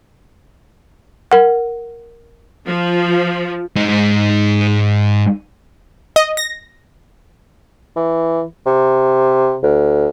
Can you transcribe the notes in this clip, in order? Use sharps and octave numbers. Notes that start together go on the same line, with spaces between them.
A#4 F#5
F3
G#2 D#4
D#5
A#6
E3
C3
D2